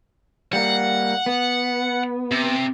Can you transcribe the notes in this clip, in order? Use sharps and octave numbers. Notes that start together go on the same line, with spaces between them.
G3 A#3 F#5
B3
C3